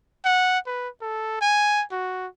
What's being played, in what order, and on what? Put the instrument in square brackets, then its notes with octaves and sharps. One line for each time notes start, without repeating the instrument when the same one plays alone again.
[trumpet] F#5
B4
A4
G#5
F#4